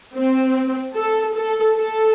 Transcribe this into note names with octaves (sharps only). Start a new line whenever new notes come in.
C4
A4
A4
A4